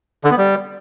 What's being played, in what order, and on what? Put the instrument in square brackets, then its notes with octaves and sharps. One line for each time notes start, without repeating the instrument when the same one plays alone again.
[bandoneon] D3
B3
G3